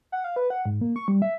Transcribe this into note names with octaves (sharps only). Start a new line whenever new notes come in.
F#5
F5
B4
F#5
G#2
A#3
C#6
G3
E5